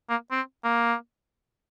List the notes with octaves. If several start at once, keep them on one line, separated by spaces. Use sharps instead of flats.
A#3
C4
A#3